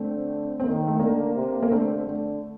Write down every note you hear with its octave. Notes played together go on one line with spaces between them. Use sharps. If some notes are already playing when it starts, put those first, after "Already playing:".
Already playing: D3 A3 C4
C4
D#3 A#3
A3
D3 A#3
C3
A#3
D3 A3 C4
D3 A3